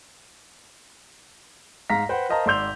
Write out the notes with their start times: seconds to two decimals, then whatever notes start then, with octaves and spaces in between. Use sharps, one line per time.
1.90 G#2 F5 A#5 A#6 B6
2.09 B4 C5 F#5 G5
2.29 A#4 C5 D#5 F5 A5 A#5
2.46 G#1 D5 C6 E6 G6 F7